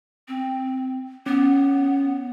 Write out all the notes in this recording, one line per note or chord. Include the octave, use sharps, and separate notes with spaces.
C4
B3 C#4